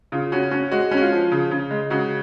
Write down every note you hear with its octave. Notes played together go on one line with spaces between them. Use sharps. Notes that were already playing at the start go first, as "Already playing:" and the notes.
C#3 F4
C#4 F#4
C#4 F#4
G#3 F#4
C#4
F#4
F4
F3
C#3
C#3
G#3
C#3 F#4